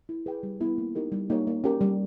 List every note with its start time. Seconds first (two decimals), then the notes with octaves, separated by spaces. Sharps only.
0.09 E4
0.26 G#4 B4 G5
0.43 G3
0.60 B3 E4
0.78 A#3
0.95 D#4 G4 A#4
1.12 G3
1.30 A#3 D#4 G4 C#5
1.47 A#3
1.64 C#4 G4 A#4
1.81 G3